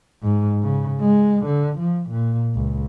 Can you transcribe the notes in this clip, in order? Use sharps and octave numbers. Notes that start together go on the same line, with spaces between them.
G#2
C#3
G#3
D3
F3
A#2
C#2